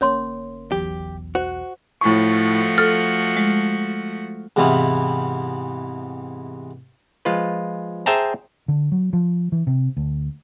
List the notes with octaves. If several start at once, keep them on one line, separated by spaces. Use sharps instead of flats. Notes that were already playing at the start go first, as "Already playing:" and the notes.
G1 A#3 C#4 C#5 C6
B1 E2 B2 G4
F#4 C5
A2 F3 A3 F#4 C#6
A4 F6
G#3
G#2 C3 E3 B3 E4 F4
F3 G#3 F4 B4
G#4 C5 E5 G5 A5 A#5
D3
F#3
F3
E3
C3
D2